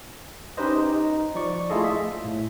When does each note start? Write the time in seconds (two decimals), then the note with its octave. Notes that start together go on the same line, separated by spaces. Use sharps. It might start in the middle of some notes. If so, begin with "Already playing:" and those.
0.57 C#4 D#4 G4 B4 C5 D#5
0.78 D#4
1.35 F3 D5 C#6
1.70 A3 E4 F4 G#4 A4 D#5
1.84 E5
2.24 A2